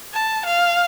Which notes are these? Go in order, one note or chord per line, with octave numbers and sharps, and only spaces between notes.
A5
F5